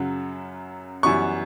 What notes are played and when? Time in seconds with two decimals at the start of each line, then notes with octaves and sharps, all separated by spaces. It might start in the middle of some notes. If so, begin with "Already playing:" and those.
Already playing: F#2 C#3 F#3
1.03 F#2 E3 G3 B3 C#6